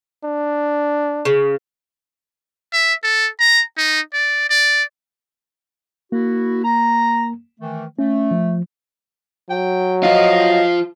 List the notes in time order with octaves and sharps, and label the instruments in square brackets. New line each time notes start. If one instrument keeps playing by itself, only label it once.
[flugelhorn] D4
[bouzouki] C#3
[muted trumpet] E5
A4
A#5
D#4
D5
D5
[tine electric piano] A#3 [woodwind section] E4 F#4
[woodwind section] A#5
D#3 E3 A3
[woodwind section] A3 [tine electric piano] C#4
[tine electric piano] F3
[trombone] F#3 [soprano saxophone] G5
[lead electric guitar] F3 F4 [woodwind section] D#5 [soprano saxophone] F5